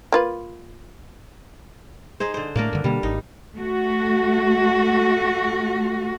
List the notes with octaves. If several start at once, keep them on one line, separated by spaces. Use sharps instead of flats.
A#3 F4 B4
D#4 G#4 C5
D3 C5
A2 A3 A#3 D4 A#4
G2 D3
B2 D3 G3 A#3
G#1 D#4
A3 F#4